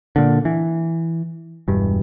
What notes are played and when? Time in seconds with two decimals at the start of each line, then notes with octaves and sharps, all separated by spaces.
0.16 A#2 D3
0.45 E3
1.68 E1 G2